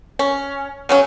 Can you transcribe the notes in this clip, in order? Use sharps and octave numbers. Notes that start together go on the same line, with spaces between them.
C#4
C#3 F#3 C#4